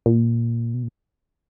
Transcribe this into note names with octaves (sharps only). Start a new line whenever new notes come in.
A#2
B2
A#2